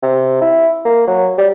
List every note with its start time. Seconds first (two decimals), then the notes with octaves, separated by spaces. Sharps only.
0.03 C3
0.41 E4
0.85 A#3
1.07 F#3
1.38 G3